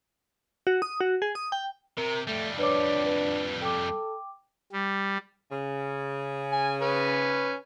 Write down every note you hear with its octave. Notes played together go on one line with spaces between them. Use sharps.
F#4
D#6
F#4
G#4
D#6
G5
C3 A#4
F2 G3 A3
D4 B4 C#5 D6
B4
A4 G5 D6
G3
C#3
G#5
C#4 B4